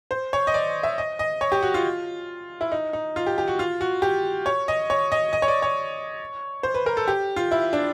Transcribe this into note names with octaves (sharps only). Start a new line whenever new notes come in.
C5
C#5
D#5
D5
E5
D#5
D#5
C#5
G4
F#4
F4
E4
D#4
D#4
F4
G4
G4
F#4
F4
F#4
G4
C#5
D#5
C#5
D#5
D#5
C#5
D5
C#5
C5
B4
A#4
A4
G4
F4
E4
D4